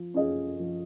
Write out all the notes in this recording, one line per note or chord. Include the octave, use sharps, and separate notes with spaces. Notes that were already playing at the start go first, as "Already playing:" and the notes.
Already playing: F3
C#4 F4 G#4 D#5
F3